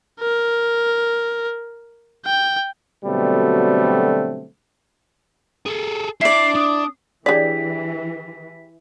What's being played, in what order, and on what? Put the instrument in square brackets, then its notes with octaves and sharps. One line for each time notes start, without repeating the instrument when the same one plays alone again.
[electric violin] A#4
G5
[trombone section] B2 D3 F#3 G3 A3 C4
[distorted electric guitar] G#4 A4
[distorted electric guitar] D4 [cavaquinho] E4 D5 [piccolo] C7
[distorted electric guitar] D4 [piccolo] D#6
[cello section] E3 [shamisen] D4 D5 [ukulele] G4 G#4 C#5 [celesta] B6